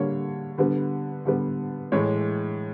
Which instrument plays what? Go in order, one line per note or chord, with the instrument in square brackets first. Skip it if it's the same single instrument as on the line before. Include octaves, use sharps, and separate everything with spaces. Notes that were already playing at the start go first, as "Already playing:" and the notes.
Already playing: [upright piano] D3 G3 A#3 C#5
D3 G3 B3 B4
D3 G3 B3
A2 E3 G#3 C#5